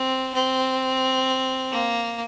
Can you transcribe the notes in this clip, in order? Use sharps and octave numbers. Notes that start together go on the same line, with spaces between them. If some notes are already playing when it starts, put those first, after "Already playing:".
Already playing: C4
C4
A#3